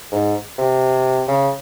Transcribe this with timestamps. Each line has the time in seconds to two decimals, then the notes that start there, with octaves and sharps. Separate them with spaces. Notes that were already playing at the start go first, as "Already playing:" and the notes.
0.12 G#2
0.58 C3
1.28 C#3